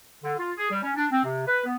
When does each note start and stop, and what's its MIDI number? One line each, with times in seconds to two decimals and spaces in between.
0.23 0.33 50
0.38 0.50 65
0.57 0.69 68
0.70 0.79 55
0.83 0.91 61
0.95 1.05 62
1.11 1.22 60
1.24 1.44 48
1.46 1.62 71
1.65 1.75 59